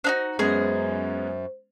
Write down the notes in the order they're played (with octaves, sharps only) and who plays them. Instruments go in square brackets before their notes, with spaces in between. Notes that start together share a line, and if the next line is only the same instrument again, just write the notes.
[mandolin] D4 D#4 F#4 [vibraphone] C5
[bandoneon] F#2 [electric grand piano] G#3 B3 C#4 [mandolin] G#4 A#5